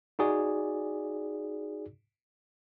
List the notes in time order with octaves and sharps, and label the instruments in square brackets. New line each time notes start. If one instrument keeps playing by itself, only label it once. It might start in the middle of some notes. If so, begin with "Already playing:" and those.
[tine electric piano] D#4 F#4 G#4 D5